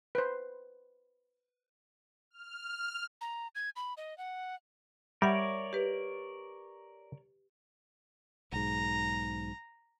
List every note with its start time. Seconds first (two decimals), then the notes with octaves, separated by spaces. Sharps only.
0.15 B4 C5
2.31 F6
3.21 A#5
3.55 G#6
3.76 B5
3.97 D#5
4.18 F#5
5.22 G3 A#4 C#5 D5 E5 F#5
5.73 G4 B4
8.52 B1 G#2 A#5